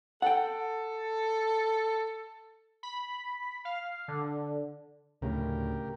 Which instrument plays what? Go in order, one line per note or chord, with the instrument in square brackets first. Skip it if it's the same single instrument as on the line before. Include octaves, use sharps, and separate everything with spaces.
[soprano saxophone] A4 [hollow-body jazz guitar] F#5 G5
[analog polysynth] B5
F5
D3
[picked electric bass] D2 A2 [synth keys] C#3 [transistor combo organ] G4 A#4